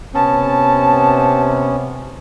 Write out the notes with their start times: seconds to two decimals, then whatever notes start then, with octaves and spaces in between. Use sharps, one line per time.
0.14 C3 B3 C#4 A5